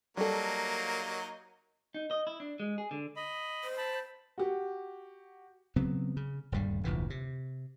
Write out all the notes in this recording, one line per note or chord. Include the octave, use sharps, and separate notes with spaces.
F#3 G3 A#3 D#4 A4
D#4
D#5
E4
D4
G#3
G#4
D3
D#5 B5
C5
A5 B5
F#4 G4
C#3 F#3 B3 C4
C#3
D#1 D2 G2 G3
F1 D2 A#2 E3
C3